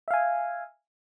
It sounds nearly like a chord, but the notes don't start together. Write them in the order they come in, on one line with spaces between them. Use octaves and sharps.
E5 F5 G#5